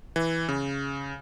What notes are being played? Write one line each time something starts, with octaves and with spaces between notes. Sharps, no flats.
E3
C#3